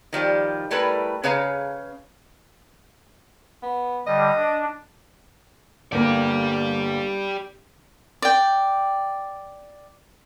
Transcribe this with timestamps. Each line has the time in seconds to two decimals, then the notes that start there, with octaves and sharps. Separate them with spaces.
0.13 D#3 F3 G3 G4
0.71 G3 A3 E4 A#4 B4
1.23 C#3 G#4 B4 C#5 F5 A#5
3.63 B3
4.06 D3 G3 D#5
4.36 D4
5.92 G1 A#3 G4 D5
8.22 D5 G5